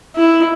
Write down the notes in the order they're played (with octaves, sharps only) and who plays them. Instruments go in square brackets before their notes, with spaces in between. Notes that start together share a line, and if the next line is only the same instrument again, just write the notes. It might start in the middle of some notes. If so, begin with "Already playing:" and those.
[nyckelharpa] E4